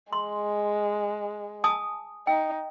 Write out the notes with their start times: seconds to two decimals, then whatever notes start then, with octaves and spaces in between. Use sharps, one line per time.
0.13 G#3 C6
1.64 G#5 A5 D#6
2.27 D#4 G5